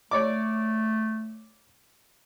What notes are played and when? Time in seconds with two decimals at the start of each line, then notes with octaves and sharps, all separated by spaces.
0.11 A3 C#5 D5 D6